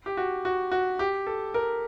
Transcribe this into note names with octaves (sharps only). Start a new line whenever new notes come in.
G4
F#4
F#4
F#4
G4
A4
A#4